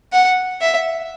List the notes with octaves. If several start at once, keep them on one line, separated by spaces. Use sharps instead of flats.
F#5
E5